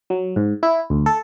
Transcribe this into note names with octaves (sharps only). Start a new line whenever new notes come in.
F#3
G#2
E4
D2
A4